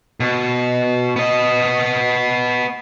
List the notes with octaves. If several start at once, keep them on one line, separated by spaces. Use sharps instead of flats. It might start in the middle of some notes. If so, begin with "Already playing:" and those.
B2
B3 D#5